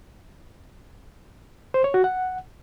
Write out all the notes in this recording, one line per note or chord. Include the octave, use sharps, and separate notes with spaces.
C5
C#5
F#4
F#5